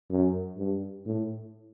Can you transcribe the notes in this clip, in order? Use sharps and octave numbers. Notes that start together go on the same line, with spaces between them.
F#2
G2
A2